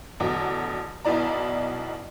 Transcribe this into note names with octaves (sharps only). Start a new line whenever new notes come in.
A1 E2 D3 F#3
B1 B2 E4 D5 A#5